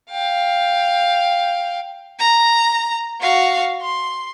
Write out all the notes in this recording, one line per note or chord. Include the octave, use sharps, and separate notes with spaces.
F5 G5
A#5
F#4 F5
C6